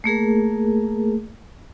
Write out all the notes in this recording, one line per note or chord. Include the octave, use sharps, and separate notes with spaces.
A3 A#3 G#4 A#4